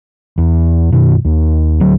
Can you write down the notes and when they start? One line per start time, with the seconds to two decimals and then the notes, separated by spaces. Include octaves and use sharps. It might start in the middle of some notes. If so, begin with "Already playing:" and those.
0.38 E2
0.92 F#2 B2 D#3
1.25 D#2
1.80 D2 F#3